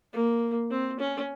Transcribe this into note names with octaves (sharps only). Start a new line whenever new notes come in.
A#3
C4
C#4